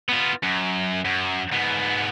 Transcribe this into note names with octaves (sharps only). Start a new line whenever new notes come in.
B3 F4
F#2
F#2
G#2 B3